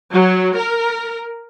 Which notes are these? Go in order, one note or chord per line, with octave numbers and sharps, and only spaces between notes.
F#3
A#4